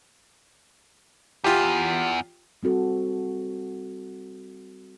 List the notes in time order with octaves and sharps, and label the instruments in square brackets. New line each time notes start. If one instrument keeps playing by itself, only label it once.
[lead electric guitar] E2 [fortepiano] F4 G4
[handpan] G3 C4 F#4 A4